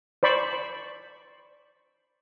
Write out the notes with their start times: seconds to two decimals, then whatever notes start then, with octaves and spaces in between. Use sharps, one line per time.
0.23 C5 D5 B5 C#6